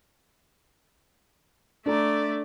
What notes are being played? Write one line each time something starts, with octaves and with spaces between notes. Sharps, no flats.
A3 D4 A4 D5 A#5